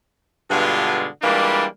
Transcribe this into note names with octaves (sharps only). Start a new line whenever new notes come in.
G2 B2 D3 G#3 F4
E3 G3 G#3 A#3 D4 F4